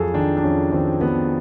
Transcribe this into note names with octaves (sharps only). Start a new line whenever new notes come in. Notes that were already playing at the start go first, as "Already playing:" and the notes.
Already playing: F2 F#3 F#4 G#4 A4
D#3 D4
D4
F2 C#4
D#3 C4
D#3 B3